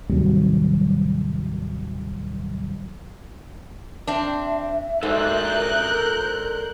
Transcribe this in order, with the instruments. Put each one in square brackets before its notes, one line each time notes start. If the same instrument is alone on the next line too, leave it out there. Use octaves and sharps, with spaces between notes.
[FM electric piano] D#2 A2 C3 D#3 F#3 G3
[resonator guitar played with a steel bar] C4 D4 [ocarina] E5
[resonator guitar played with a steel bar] G#2 [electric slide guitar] A4 C5 D5 [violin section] A#4 F#6 G6